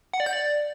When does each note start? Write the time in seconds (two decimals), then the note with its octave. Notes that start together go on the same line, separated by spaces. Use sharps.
0.13 F#5
0.20 D5
0.26 G6
0.33 D5